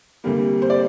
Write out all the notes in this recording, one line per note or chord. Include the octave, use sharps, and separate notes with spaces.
D2 C3 G3 A#3
C5
D5